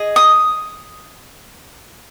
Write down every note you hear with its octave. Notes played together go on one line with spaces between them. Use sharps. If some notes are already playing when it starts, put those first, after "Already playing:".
Already playing: G#4 D#5
D#6